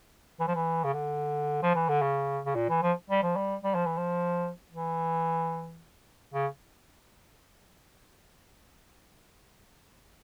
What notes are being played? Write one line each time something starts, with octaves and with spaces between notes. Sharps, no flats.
E3
F3
E3
C#3
D3
F3
E3
D3
C#3
C#3
A#2
E3
F3
G3
F3
G3
G3
F3
E3
F3
E3
C#3